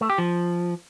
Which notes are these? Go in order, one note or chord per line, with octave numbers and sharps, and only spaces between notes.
A3
G4
F3